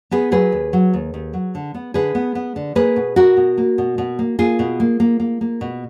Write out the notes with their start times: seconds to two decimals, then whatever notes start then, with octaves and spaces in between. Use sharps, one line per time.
0.11 B3 G#4 B4
0.31 F#3 G#4 B4
0.52 D#2
0.73 F#3
0.93 D#2
1.14 D#2
1.34 F#3
1.55 D3
1.74 B3
1.94 D3 G#4 B4
2.15 B3
2.35 B3
2.56 D3
2.75 A#3 G#4 B4
2.96 B2
3.16 B2 F#4 A#4
3.37 B2
3.58 A#3
3.78 B2
3.98 B2
4.19 A#3
4.39 A#3 F4 G#4
4.59 B2
4.80 A#3
5.00 A#3
5.20 A#3
5.41 A#3
5.61 B2